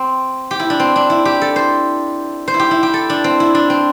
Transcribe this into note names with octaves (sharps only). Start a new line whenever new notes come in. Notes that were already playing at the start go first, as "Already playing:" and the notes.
Already playing: C4
G4
E4
D4
C4
D4
E4
G4
A4
C5
C5
E4
G4
E4
G4
A4
D4
C4
E4
D4
C4